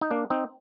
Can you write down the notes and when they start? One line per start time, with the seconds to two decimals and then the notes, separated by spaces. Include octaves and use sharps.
0.01 D#4
0.11 A#3 D4
0.30 C4 D#4